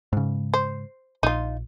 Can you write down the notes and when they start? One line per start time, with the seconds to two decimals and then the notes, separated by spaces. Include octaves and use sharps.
0.13 G#2 C#3
0.54 C5
1.23 A#1 D#4 F4